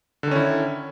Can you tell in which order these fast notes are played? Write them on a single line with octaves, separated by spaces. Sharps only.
D3 D#3 C#4 E4